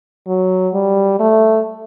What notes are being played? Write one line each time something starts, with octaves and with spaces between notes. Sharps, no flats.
F#3
G3
A3